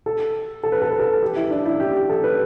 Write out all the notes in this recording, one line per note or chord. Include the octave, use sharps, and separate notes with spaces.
A4
A4
B4
A4
B4
A4
G4
E4
D4
E4
G4
G4
A4
B4